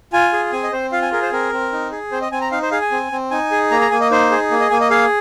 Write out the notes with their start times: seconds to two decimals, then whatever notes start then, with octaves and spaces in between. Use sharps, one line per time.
0.13 F4 G#5
0.33 G#4
0.52 C4 G#5
0.63 D#5
0.72 C4 C5
0.92 F4 F5
1.02 G#5
1.12 G#4 A#4
1.22 C5
1.32 C4 A#4
1.53 C4
1.72 D#4
1.92 G#4
2.12 C4 C5
2.22 D#5
2.32 C4 G#5
2.41 A#5
2.52 D#4 F5
2.62 C5
2.71 G#4 F5
2.82 G#5
2.91 C4
3.12 C4
3.31 D#4 G#5
3.51 G#4
3.71 A#3 A#5
3.81 A#5
3.91 A#3 G#5
4.01 D#5
4.11 D#4 C5
4.31 G#4
4.51 A#3
4.60 D#5
4.71 A#3 G#5
4.81 D#5
4.91 G#4 F5